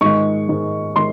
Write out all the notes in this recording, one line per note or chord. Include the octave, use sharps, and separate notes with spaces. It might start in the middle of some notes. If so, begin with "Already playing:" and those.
G#2 D#3 G#3 C#6
G#2 D#3 G#3
D#3 G#3 C6